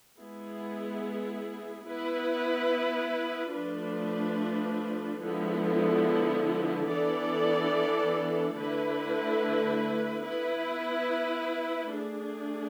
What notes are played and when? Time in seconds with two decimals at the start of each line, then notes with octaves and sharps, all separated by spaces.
0.18 G#3 B3 E4 G#4
1.85 B3 E4 B4
3.54 F3 A3 D4 F4 B4
5.22 D3 F3 G#3 B3 E4
6.88 E3 B3 D4 A4 D5
8.57 D3 A3 E4 B4
10.25 B3 E4 B4
11.92 A3 D4 G#4